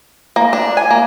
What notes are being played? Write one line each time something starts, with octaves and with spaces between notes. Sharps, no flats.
A#3
D4
G#5
A#3